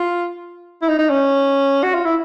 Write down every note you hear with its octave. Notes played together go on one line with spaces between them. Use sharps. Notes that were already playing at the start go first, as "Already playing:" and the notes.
Already playing: F4
E4
D#4
D#4
C#4
F#4
F4
E4